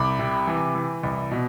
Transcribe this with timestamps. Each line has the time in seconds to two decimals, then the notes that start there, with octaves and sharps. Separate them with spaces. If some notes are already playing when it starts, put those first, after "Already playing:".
Already playing: C2 B5 D6
0.19 C3
0.47 E3
0.75 E3
1.03 C2
1.31 B2